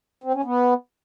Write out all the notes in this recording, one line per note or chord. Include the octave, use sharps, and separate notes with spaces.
C4
C#4
B3